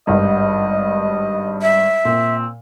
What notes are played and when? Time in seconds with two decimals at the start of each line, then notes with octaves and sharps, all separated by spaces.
0.07 G#1 G2 D#5
1.62 E5
2.05 A#2 C4